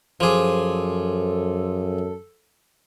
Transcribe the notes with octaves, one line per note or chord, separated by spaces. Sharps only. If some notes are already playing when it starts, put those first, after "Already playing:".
F#2 F3 G#4 A4 C5 C6 D6